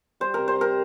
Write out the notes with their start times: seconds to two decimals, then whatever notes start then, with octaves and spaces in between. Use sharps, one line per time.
0.20 G3 C5
0.34 C3 A#4
0.48 C5
0.56 G3
0.61 A#4